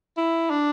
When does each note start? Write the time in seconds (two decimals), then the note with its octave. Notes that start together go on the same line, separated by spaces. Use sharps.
0.18 E4
0.50 D4